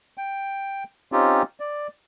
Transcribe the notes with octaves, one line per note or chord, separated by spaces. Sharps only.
G5
C4 C#4 D#4 F4 G4
D5